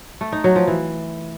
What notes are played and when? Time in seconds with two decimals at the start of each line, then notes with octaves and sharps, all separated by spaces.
0.21 A3
0.32 D#4
0.44 F#3
0.56 F3
0.67 E3